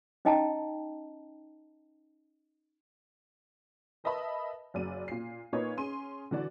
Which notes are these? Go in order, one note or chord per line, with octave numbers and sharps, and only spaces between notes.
C#4 D#4 D#5 G5 A5 A#5
A#4 B4 D#5 E5 A5 B5
F#1 F#2 D5 D#7
A#2 C7
A#2 A#3 D#4 B4 C#5
C#4 G#4 C6 D#7
D3 E3 F#4 D5